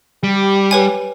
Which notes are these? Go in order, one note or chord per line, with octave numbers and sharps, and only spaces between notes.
G3 G4
B4 C#5 G#5